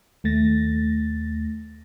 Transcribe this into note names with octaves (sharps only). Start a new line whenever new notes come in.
D#2 A3 A6 A#6